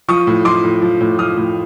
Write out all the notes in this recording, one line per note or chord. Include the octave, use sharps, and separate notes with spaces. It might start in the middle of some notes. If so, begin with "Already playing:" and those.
F3 C#6 D#6
A2
F3 C6 D6
A2
F3
A2
F3 D#6 F6
A2